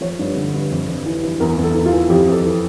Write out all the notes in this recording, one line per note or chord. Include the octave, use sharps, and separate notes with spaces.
F3 C#5
G2
D3
G2
F2
F2
E3
E3
E2 A#4
E2
A4
E3
F4
E3
F2 G4
F2
A4
E3